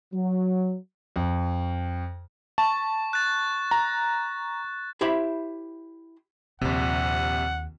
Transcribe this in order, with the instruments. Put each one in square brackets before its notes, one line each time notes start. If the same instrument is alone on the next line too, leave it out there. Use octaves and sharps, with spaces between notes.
[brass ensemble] F#3
[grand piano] F2
[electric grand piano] A5 [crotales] C#6
[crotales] F#6 A6
[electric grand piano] A#5
[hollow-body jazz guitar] E4 G4 C5 E5 B5
[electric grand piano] A#1 C3 [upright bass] D#2 [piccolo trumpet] F#5